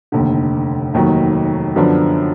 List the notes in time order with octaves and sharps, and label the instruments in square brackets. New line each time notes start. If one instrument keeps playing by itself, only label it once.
[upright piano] F1 D#2 D3
F1 D#2 D#3 F#3
F#2 D3 F3 B3 D4